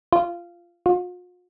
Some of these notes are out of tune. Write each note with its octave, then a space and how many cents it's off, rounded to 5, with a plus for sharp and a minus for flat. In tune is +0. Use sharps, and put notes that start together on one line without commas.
F4 -15
F4 +45